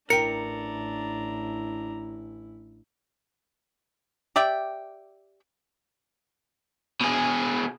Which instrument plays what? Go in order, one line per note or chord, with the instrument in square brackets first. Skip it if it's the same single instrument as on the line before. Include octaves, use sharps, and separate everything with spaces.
[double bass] A1 E4 [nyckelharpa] D4 A#5 [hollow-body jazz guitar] A#4 G5 [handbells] C#7
[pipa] G4 D5 E5 G5
[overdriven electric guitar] B2 G#4